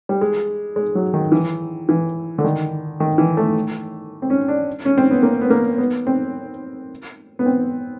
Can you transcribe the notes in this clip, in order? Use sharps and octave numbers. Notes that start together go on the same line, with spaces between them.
G3
G#3
G#3
F#3
D#3
E3
E3
D3
D#3
D#3
E3
A3
C4
C#4
D4
C#4
C4
B3
A#3
B3
A#3
B3
C4
B3
C4